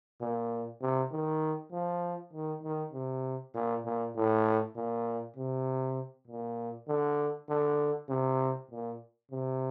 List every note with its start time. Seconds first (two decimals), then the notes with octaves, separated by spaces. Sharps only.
0.21 A#2
0.81 C3
1.12 D#3
1.72 F3
2.33 D#3
2.63 D#3
2.93 C3
3.54 A#2
3.85 A#2
4.16 A2
4.76 A#2
5.36 C3
6.28 A#2
6.88 D3
7.49 D3
8.09 C3
8.71 A#2
9.31 C3